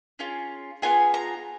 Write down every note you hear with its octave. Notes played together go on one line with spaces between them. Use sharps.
C#4 F4 G#4
B3 F4 G#4 G#5
A#5